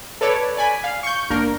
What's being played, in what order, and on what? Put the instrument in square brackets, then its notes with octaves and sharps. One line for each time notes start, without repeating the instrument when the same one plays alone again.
[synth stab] A4 B4 C#5 D5
D5 G#5 B5
F5
C#6 G6
G1 A#3 D4 A#4